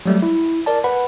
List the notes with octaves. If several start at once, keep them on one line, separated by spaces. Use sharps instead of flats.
F#3 G3 A3
E4
A#4 D5 A5
B4 F#5 B5